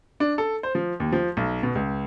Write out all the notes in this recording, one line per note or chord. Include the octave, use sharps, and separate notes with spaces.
D4
A4
C5
F3
D#2
F3
B1
B2
C#2